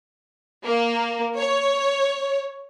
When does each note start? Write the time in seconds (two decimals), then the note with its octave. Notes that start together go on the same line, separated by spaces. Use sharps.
0.64 A#3
1.37 C#5